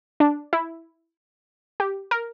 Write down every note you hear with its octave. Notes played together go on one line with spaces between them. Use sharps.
D4
E4
G4
A#4